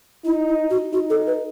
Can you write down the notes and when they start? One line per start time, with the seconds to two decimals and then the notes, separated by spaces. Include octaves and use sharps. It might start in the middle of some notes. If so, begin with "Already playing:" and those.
0.25 D#4 E4
0.48 E4
0.70 F#4
0.93 D#4 F#4
1.10 A4
1.27 B4